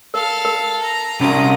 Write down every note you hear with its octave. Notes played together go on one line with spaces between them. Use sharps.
A4 A#4 F5
A#4
A#5
C2 C#4 E4 F#4 A#5 D#6